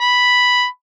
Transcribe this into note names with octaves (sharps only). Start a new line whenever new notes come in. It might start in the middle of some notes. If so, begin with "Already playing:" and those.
B5